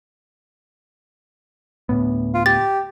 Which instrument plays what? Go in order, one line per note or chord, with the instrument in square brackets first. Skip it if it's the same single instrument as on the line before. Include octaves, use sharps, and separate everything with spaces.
[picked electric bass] D2 A2 B3
[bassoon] F4
[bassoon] G4 [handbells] A6